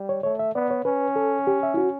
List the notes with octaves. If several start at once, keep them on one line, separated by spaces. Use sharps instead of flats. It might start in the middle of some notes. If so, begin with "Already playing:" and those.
Already playing: G3
C#5
A3 C#5
E5
B3 D5
C#5
C#4 B4
A4
G4
E5
E4
F#4